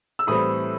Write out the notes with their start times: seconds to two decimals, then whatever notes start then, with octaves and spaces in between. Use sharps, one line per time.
0.19 E6
0.27 A2 E3 G3 C4 B5 D#6